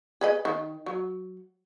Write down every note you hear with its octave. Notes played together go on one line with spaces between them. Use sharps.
G#4 B4 D#5
D#3
F#3